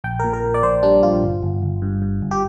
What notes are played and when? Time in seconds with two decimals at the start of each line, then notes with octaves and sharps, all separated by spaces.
0.04 A#1 G5
0.20 A#2 A#4
0.33 A#4
0.44 A#2
0.54 D5
0.63 A#1 C5
0.83 G3 D4
1.03 A#1 F4
1.23 G1
1.43 G1
1.62 G1
1.82 G2
2.02 G2
2.22 G1
2.31 G4